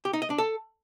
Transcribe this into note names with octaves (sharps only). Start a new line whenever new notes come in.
G4
D#4
D#5
D4
A4